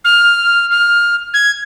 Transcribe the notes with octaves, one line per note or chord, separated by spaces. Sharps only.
F6
F6
G#6